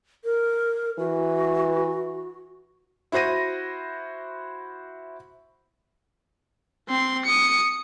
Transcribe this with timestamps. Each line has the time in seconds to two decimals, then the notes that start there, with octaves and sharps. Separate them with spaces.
0.25 A#4
0.99 E3 F#4
3.12 E4 F#4 C5 A#6 D#7
6.89 C4 C6
7.25 D#6 C#7